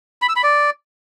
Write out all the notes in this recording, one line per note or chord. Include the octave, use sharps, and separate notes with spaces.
B5
E6
B5
D5